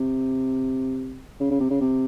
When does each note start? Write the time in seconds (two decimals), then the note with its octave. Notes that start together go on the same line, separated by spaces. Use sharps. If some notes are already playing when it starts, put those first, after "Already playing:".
Already playing: C3
1.40 C#3
1.51 C#3
1.60 C3
1.70 C#3
1.81 C3